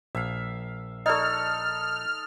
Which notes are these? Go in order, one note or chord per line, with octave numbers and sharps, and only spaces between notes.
A#1 E5 F5
D#4 G#4 A4 D5 D#5 F6